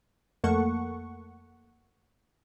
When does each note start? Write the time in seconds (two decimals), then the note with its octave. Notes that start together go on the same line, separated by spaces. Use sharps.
0.44 F2 A3 A#3 A4 F#5 C#6